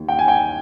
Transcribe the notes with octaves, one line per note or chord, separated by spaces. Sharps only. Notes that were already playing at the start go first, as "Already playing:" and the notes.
Already playing: D#2 D#3
G5
G#5
G5